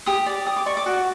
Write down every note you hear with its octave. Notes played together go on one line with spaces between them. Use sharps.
G4 D#6
D5
G4 D#6
D6
D5 C#6
D6
F#4